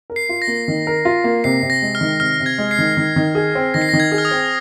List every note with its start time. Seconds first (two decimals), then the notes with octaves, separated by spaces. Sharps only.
0.10 A#4
0.16 C7
0.29 F4
0.42 A#6
0.47 A#3
0.68 D#3
0.87 A#4
1.05 F4
1.24 A#3
1.44 C3 C7
1.63 C3
1.70 A#6
1.82 G#3
1.95 F6
2.01 D#3
2.20 C3 F6
2.40 C3
2.46 G#6
2.58 G#3
2.71 C7
2.78 D#3
2.97 D#3
3.16 D#3
3.35 G#4
3.55 C4
3.74 D#3 A#6
3.82 C7
3.89 A#6
3.93 D#3
4.00 G#6
4.12 G#4
4.18 F6
4.25 D#6
4.31 C4